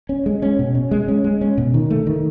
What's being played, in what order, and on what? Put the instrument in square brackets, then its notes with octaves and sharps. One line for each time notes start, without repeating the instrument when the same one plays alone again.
[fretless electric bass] C#4
G#3
C#4
B2
C#4
G#3
C#4
G#3
C#4
B2
D#3
A3
D#3